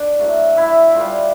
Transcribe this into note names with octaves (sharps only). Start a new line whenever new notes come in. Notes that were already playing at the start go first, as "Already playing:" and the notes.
Already playing: D4 D5
A2 F#3 A3
E4 E5
A2 E3 G3 F4 F5